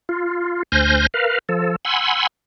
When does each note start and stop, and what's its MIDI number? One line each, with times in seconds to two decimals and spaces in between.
0.09 0.63 65
0.72 1.07 38
0.72 1.07 72
0.72 1.07 80
0.72 1.07 89
0.72 1.07 91
0.72 1.07 94
1.14 1.38 70
1.14 1.38 71
1.14 1.38 77
1.49 1.76 53
1.49 1.76 69
1.85 2.27 78
1.85 2.27 80
1.85 2.27 83
1.85 2.27 84
1.85 2.27 88